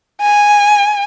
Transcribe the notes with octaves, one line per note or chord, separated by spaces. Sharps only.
G#5